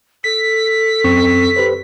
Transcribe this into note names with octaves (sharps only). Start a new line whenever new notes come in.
A4 B6
F#2 C4 C#6
G4 B4 C5